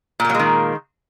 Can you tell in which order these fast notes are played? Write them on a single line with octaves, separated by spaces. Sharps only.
A#2 A#3 F#3 G#3 D#3